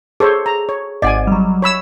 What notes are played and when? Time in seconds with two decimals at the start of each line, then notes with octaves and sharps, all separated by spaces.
0.20 G#4 A4 C5 C#5
0.46 A#5
0.69 C#5
1.02 G#1 G#2 D5 D#5 F#5 G#5
1.27 F#3 G3
1.62 C#5 B5 E6